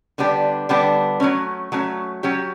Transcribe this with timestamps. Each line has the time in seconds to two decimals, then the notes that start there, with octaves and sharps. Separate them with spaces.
0.18 D3 G3 B3 D4 G4
0.69 D3 G3 B3 D4 G4
1.20 F#3 A3 C#4
1.72 F#3 A3 C#4
2.23 F#3 C#4 G4